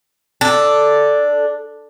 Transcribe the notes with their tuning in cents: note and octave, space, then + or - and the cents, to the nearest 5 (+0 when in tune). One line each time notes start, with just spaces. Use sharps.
D4 +0 A4 +0